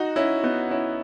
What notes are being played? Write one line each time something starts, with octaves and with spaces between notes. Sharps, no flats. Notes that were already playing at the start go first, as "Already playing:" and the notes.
Already playing: D#4 F#4
C#4 E4
B3 D#4
C#4 E4